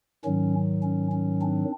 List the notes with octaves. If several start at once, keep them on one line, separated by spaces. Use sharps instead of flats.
G#2 D#3 F#3 C#4
C#4
C#4
C4 D4